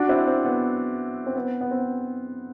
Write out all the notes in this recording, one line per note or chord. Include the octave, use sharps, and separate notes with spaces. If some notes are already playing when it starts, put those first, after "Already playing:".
Already playing: D4 F#4
C4 E4
C4
B3
C4
B3
B3
C4